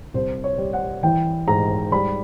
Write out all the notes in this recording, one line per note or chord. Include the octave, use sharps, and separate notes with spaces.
C2 C5
C#5
G3
F#5
E3 G5
G#2 A#5
G3 B5